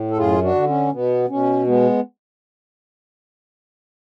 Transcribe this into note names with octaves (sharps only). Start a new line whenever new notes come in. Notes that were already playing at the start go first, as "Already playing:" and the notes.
Already playing: A2
A4
F#2 F4 G#4
D4 F#4
D3
C#4
B2 B3
B2 C#4
G#3 B3